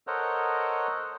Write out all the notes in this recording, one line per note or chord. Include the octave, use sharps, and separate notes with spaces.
A4 A#4 C5 C#5 D#5 F#5